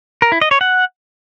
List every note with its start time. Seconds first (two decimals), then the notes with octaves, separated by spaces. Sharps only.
0.22 A#4
0.32 E4
0.41 D#5
0.51 C#5
0.61 F#5